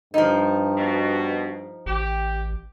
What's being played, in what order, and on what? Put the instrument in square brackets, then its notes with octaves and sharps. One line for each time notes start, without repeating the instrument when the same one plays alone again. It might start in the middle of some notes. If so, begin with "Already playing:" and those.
[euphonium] G2 [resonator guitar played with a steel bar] F3 D#4
[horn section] B2
[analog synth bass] A1 [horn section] G4